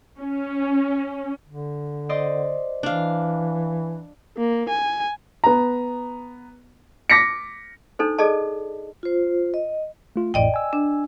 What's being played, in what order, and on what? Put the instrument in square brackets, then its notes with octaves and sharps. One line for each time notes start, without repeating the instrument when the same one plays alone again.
[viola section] C#4
[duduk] D3
[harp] C5 D5 D#5
[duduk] E3 [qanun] D4 F5
[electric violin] A#3
G#5
[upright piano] B3 A#5
D6 A#6 B6 C#7
[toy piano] D4 D#4 A4 C5
G#4 A4 D5 D#5 A5
[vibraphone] F4 C5
D#5
[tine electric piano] A3 F4
[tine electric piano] A1 F2 A2 [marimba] D5 D#5 G5
[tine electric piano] G#5 E6
[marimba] D4